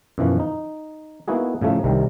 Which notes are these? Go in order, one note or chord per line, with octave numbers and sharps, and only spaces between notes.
F#2 B2 E3 F3
D#4
A#3 B3 D#4 E4 F#4 G#4
A2 C#3 F3 A3 D#4
C2 C3 D#3 G3